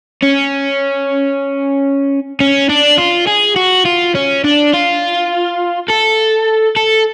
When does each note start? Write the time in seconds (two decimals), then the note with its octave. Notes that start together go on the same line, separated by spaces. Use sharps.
0.22 C#4
2.40 C#4
2.69 D4
2.98 F4
3.27 G#4
3.56 F#4
3.86 F4
4.15 C#4
4.44 D4
4.73 F4
5.90 A4
6.76 A4